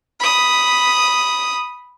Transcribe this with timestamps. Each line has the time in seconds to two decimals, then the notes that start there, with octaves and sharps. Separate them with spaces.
0.20 B5 D#6